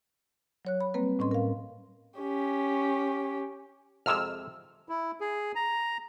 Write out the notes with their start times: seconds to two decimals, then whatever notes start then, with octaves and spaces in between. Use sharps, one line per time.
0.65 F#3 C#5 F#6
0.81 B5
0.94 G3 A#3 C4 B4
1.19 A2 C#4 D#5 C6
1.31 A#4 F5
2.19 C#4 G4
4.06 F2 C3 G#3 E6 F6
4.89 E4
5.21 G#4
5.55 A#5